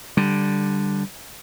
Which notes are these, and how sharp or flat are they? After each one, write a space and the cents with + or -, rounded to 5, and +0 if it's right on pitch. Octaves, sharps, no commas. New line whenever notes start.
D3 +0 G3 +0